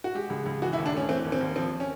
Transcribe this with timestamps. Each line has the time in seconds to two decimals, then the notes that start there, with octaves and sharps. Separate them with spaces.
0.04 F#4
0.15 G#3 G4
0.30 C#2
0.46 C#2
0.62 E3 F#4
0.73 E4
0.78 D#2
0.86 D4
0.94 A3 C#4
1.09 E3 C4
1.25 D#2
1.32 C4
1.41 D#2
1.56 F3 C4
1.80 C#4